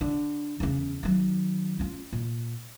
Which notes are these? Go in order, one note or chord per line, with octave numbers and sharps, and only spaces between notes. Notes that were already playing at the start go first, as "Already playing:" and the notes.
D3
E2 C#3
D#3 F#3
C#4 F4
A#2